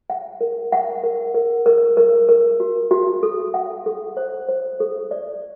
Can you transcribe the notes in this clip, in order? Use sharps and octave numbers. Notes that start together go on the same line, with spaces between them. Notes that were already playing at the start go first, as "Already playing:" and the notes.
F#5
A#4
F#5
A#4
A#4
A#4
A#4
A#4
F#4
F#4
A4
F#5
A4
C5
C5
A4
D5